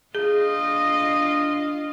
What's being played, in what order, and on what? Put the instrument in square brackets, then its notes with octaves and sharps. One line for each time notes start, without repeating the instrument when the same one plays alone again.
[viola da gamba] D4 F4 D#5 [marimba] G#4